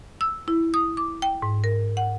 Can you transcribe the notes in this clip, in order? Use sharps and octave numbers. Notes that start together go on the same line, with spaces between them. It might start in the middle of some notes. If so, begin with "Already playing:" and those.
E6
E4
D#6
D6
G5
G#2
A#4
F#5